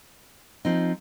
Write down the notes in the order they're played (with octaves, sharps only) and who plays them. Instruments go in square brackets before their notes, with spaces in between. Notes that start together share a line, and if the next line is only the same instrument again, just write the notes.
[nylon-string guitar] F3 C4 D#4